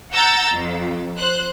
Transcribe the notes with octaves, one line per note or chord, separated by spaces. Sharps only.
F#5 A#5 E6 G6 A6
F2
C5 F#6